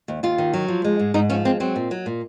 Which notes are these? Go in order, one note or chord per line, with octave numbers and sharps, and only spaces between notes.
D#2
D#2 F4
D#3
F#3
F3
G#3
G#2
G#2 D#4
F3 C#4
G#3 C4
F#3 C4
A#2
F#3
A#2